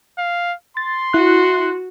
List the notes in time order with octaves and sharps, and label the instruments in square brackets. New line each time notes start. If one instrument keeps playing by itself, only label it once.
[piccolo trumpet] F5
[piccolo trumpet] C6 [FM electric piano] A6
[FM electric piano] E4 F#6 [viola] F#4